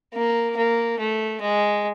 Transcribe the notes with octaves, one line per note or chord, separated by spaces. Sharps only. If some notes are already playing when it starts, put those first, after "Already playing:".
A#3
A#3
A3
G#3